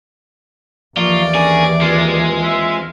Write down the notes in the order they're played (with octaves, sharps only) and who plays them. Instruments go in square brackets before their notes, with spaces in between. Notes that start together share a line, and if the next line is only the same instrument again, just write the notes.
[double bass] D#2 E3 [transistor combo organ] F3 A#3 C#6 [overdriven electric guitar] F4 [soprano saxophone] D5
[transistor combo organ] C#4 D4 A#4 [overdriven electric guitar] G#4
[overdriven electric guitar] G#3 [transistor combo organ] C4 F4
[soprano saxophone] E5